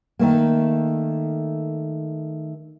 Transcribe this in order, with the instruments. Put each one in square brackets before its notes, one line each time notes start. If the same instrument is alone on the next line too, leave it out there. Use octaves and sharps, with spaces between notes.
[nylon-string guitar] D#3 A3 A#3